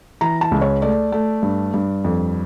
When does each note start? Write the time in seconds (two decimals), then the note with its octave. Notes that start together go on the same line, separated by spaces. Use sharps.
0.21 E3 A#5
0.41 A5
0.51 C#2
0.62 C#5
0.82 A3 D5
1.12 A3
1.43 G2
1.74 G2
2.04 F2